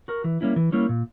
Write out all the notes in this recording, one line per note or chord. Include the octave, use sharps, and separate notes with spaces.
F#4 A#4
E3
G3 A#3 C#4 E4
E3
G3 A#3 C#4 E4
A#2